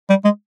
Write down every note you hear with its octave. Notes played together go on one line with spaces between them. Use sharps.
G3
G#3